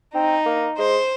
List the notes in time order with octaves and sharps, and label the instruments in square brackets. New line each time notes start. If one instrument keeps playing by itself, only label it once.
[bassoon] C4 [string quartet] D#4
[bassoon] A#3
[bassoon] G#3 [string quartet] C5